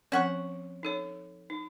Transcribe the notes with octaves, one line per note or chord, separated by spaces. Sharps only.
F3 C4 C#4 F#5 C#6
D#4 A4 C#5
D#4